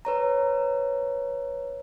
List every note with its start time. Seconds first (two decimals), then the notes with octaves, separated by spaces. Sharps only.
0.05 B4 C#5 A#5